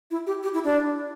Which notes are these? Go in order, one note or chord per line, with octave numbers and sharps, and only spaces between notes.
E4
G4
G4
E4
D4